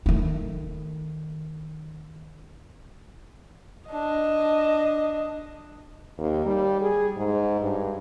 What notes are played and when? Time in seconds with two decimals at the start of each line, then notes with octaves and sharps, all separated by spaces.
0.06 D#3 A3
3.90 D4 D#5
6.18 D#2
6.46 G3
6.81 G#4
7.16 G#2
7.60 G2